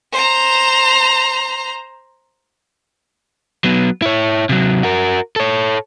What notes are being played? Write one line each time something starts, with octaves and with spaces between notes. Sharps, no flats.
C5 A#5
F#3 B3
E4 C#5
C3 F#3
F#4 A#4
A4 C#5